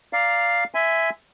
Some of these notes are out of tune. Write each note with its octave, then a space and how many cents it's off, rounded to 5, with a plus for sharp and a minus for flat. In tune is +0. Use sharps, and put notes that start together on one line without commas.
D5 +0 F5 +0 A#5 +0
E5 +0 G#5 +0 C6 -45